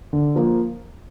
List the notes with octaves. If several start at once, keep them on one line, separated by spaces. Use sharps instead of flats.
D3
F3 A#3